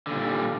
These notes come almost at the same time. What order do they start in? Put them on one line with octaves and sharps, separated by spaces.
D3 A#2 G3